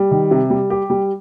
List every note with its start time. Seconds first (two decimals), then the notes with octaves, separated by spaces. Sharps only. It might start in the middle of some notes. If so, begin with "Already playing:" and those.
Already playing: G3
0.11 D#3
0.31 C3
0.50 G3
0.70 G4
0.90 G3